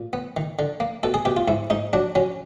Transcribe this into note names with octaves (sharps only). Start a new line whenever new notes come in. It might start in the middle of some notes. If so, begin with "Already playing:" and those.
Already playing: A#2
B3
D#3
D3
A#3
B2 A4
G#4
B2 G4
F4
G#2 E4
G#2 D#4
F#3 D4
F#3 C#4